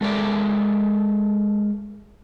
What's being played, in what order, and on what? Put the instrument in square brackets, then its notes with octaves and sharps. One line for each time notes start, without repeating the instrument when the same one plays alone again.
[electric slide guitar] G#3 A4 A#4 D5 E5